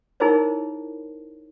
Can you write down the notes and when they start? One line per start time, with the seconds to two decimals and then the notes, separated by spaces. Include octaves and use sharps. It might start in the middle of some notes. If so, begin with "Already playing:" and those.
0.20 D#4 E4 G#4 A#4 C5 C#5